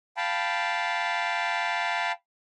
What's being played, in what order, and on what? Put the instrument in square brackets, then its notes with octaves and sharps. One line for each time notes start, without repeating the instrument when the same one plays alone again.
[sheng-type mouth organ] F5 G5 A5 B5